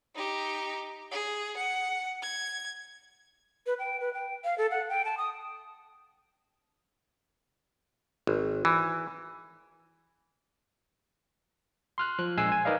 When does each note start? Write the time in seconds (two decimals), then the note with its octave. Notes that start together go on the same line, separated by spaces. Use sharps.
0.15 D#4 G4
1.12 G#4
1.57 F#5
2.22 G#6
3.66 B4
3.79 G5
4.00 B4
4.14 G5
4.44 F5
4.58 A4
4.71 F#5
4.89 G5
5.05 A5
5.18 D#6
8.27 G#1
8.65 E3
11.98 C6 F6 F#6
12.19 F3 F#6
12.37 A#1 G#3 G#5 E6 C7
12.52 G#5
12.65 D#4 A#4 B4 D5 D#5 F5